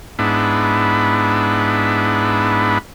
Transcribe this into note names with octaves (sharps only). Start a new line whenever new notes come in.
G#2 B3 D4 E4